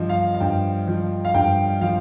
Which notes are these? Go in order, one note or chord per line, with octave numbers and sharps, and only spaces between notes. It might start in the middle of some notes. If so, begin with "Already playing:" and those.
Already playing: G2 F3 D#5
F5
F5
G2 G5
F3
F5
G2 G5
F3 F5